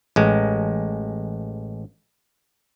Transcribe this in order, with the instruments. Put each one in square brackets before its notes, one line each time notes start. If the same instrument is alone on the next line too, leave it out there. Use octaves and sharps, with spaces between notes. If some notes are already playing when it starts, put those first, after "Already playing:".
[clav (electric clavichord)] A1 G#3